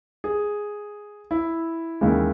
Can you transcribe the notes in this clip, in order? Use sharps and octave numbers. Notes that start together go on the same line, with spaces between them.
G#4
E4
D#2 C#3 E3 G#3